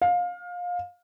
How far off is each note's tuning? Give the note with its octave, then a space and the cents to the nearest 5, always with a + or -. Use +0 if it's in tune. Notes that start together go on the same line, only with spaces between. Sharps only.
F5 +25